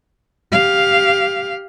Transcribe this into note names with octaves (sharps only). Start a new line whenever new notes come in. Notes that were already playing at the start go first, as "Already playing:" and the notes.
G4 F5